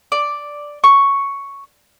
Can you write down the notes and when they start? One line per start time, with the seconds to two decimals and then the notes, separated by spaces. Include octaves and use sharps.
0.12 D5
0.84 C#6